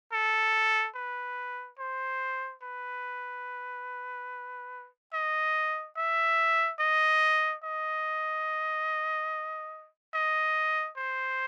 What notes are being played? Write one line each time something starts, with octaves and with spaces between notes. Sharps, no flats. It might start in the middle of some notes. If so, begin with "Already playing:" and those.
A4
B4
C5
B4
D#5
E5
D#5
D#5
D#5
C5